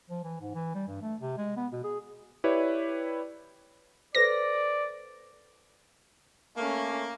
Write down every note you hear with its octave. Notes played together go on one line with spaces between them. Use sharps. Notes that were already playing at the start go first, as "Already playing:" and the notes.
F3
E3
G#2
E3
G3
G2
A3
C3
G#3
B3
B2
G#4
E4 G4 B4 C#5 D5
A4 B4 C5 D5 A#6
A3 A#3 C#4